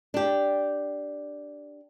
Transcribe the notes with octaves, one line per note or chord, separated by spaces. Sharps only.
D4 G4